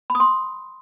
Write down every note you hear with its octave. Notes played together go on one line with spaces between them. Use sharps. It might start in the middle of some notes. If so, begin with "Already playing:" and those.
B5
D#6
C6